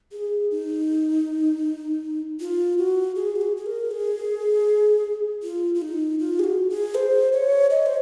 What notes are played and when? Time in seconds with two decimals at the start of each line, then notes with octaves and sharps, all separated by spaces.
0.12 G#4
0.51 D#4
2.40 F4
2.78 F#4
3.16 G#4
3.36 F#4
3.41 G#4
3.57 G#4
3.66 A#4
3.91 G#4
5.43 F4
5.75 F4
5.82 D#4
6.19 F4
6.39 G#4
6.44 F#4
6.70 G#4
6.95 C5
7.33 C#5
7.70 D#5
7.86 C5